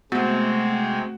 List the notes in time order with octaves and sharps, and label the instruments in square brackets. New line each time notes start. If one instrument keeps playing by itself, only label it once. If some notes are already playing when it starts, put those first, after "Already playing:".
[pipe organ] C3 G#3 C4 [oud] A3 [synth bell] B3 [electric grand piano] F#4